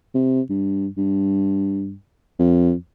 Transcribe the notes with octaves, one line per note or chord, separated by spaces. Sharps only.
C3
G2
G2
F2